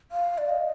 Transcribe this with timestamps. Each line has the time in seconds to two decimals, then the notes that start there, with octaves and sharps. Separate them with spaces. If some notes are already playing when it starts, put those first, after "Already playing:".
0.11 F5
0.38 D5
0.49 D#5